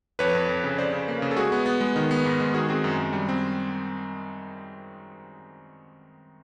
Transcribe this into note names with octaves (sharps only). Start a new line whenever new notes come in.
F2 B4 C#5
F2
F2
C#3
C#3 C5 D5
C#3
A#3
C#3
A4
G#3 F#4 G#4
B3
B3
G#3
D#3
B3
G#2
G#3
D#3 F#4 G#4
C4 F#4 G#4
F#2
F#2
G3
C4